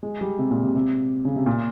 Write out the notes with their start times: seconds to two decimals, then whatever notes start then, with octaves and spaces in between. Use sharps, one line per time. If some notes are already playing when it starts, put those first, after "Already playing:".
0.03 G#3
0.21 G3
0.39 C3
0.51 A#2
0.63 C3
0.75 C3
1.25 C#3
1.36 C3
1.46 A#2